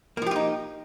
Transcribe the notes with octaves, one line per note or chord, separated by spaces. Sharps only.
F3 A#3 D#4 F4 G4